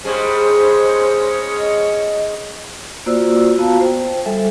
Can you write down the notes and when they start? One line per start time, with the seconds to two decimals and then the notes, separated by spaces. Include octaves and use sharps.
0.05 G#2 G3 G#3 C#4 G#4 C5 C#5
1.59 D#5
3.06 A#3 F4 F#4 C5 D5 E6
3.58 B3 F4 F#4 F5 A5 A#5
3.80 C5 G5
4.26 G3 A4 E5 G#5